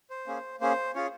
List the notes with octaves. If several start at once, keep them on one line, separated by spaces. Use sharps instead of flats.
C5
A#3 C#4 G#4
A#3 C#4 G#4 C5
C#4 F4 G#4 C#5